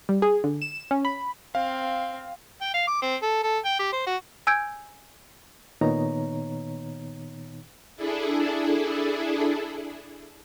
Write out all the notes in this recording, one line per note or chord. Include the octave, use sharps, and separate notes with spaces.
G3
G#4
D3
E7
C#4
B5
C4 F5
G5
F5
D6
C4
A4
A4
G5
G4
C5
F#4
G#5 E6 G6 G#6 D7
A#2 D#3 B3 D#4 C#5 A#5
D4 E4 G#4 A4